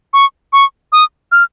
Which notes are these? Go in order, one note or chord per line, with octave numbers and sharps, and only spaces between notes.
C#6
C#6
D#6
F6